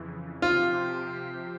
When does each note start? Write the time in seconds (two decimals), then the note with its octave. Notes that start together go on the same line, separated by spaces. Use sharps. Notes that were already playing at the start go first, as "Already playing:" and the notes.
Already playing: F2 C#3 E3
0.42 C3 F3 C4 F4 G4 C5